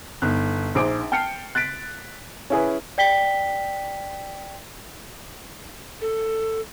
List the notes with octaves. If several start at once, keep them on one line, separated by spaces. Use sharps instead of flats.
G1 D#4 F#6
A#1 D#4 G#4 C5 D6 D7
G5 A5 F6 C7 C#7
F#6 A6 B6 D7
C#4 E4 G#4 B4
D5 G5 B6 G7
A4